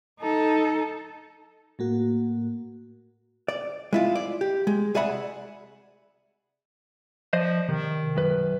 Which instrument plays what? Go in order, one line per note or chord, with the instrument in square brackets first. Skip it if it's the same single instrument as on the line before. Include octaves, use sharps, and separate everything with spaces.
[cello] D#4 A4
[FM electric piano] A2 A#3 F#4
[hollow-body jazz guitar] D5
G#3 E4 F4
D5
G4
G#3
C2 G#4 D5 E5 F#5 B5
[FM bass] F3 [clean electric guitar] C5 D5 D#5
[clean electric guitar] C3 [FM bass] D#3
[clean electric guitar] B1 F#2 B4